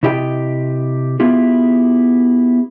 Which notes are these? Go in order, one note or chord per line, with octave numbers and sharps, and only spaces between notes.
C3 E4 G4 D#5 G5
B3 E4 F4 G4 G#4